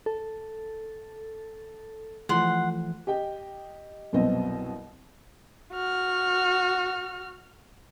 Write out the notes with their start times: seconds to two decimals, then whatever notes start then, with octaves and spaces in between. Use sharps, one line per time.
0.06 A4
2.29 E3 F3 A3 F#5 C6
3.07 G4 D#5 G5
4.13 C2 F#2 B2 B3 C4 D#5
5.74 F#4 F6